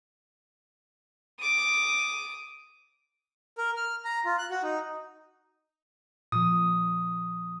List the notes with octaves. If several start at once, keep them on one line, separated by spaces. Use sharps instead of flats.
D6 D#6
A#4
F6
A#5
F4
F#6
F#4
D#4
A#2 F3 D#6